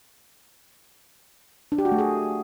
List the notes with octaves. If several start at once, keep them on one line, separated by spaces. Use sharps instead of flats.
D4
G4
F#4
A3
G#4